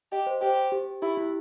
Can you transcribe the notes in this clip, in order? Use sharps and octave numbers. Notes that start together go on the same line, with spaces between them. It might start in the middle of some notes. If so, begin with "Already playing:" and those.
G4 D#5
C5
G4 C5
G4
E4 G4
E4